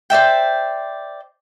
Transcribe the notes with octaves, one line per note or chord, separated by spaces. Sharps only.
C5 D5 E5 G5